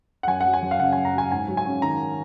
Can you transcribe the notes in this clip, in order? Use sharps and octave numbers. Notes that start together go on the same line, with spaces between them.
F#5
F#2 G#5
F#3 F#5
G#5
F#2
F5
C#3 F#5
F#2 G#5
A#5
F#3 G#5
G#2 G#5
F#3
G#5
C#4
D#3 A#5